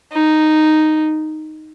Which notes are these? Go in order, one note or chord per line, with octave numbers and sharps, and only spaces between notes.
D#4